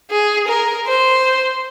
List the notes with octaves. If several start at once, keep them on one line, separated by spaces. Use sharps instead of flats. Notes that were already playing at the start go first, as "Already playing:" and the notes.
G#4
A#4
C5